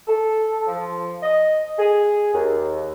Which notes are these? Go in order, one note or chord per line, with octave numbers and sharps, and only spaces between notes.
A4
F3
D#5
G#4
D#2